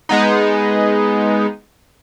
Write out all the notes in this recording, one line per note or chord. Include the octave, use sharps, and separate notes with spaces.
G#3 B3 D#4